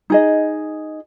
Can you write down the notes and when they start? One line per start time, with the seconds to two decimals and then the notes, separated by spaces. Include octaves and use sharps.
0.10 D#4 G#4 D#5